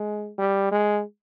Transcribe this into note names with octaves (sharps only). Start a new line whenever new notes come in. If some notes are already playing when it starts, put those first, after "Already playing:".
Already playing: G#3
G3
G#3